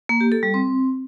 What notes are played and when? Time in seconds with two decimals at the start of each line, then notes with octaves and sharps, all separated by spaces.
0.09 A#3
0.21 G4
0.32 A4
0.43 G3
0.54 C4